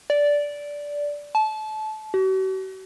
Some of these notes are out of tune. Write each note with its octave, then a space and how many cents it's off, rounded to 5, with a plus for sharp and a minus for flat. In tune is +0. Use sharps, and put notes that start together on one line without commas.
D5 -10
A5 -25
F#4 +45